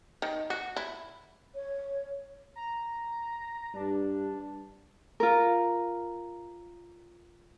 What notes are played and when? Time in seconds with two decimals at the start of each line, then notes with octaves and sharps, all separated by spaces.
0.22 D#3
0.50 F#4
0.76 E4
1.55 C#5
2.56 A#5
3.74 G2 D4
5.20 F4 A#4